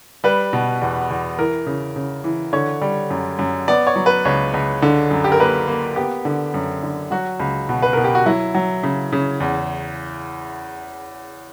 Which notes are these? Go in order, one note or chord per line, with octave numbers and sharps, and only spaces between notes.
G3 B4
B2
E2
E2
E3 A#4
C#3
C#3
E3
D3 C#5
G3
F#2
F#2
B3 D5
C#5
F#3
B4
C#2 C#5
C#2
D3
F#2
G4
A#4
A#3 B4
A#3
B3 G4
D3
F#2
D3
F#3 F#4
C#2
B2
B4
B2 A#4
G4
F#4
F#3 E4
F#3
C#3
C#3
E2